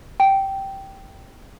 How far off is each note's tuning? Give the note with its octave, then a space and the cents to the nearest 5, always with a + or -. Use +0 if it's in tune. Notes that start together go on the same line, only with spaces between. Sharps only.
G5 -10